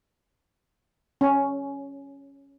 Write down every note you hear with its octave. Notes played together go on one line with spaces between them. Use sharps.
C#4